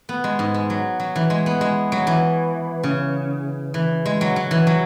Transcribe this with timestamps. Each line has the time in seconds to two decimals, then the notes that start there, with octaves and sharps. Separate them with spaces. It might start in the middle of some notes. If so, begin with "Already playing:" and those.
0.09 B3
0.24 G#3
0.39 G#2
0.54 G#3
0.70 F#3
1.00 F#3
1.16 E3
1.30 G#3
1.46 B3
1.61 G#3
1.92 F#3
2.07 E3
2.83 C#3
3.74 E3
4.06 G#3
4.21 F#3
4.36 F#3
4.51 E3
4.67 F#3